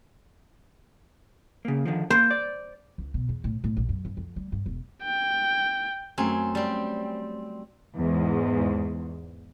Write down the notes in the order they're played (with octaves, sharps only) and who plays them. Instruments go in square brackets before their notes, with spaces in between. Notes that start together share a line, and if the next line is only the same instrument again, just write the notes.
[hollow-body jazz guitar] C#3 A#3
D3 D#3 F3
[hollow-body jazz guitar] A#3 [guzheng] C5
[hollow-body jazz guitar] D5
[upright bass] C#2
B2
E2
A2
A2
A#1
F#2
G2
F2
G3
G2
E1
[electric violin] G5
[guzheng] F#2 C4 [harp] F#3 A3 G#5
[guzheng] G3 C4
[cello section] E2 G#2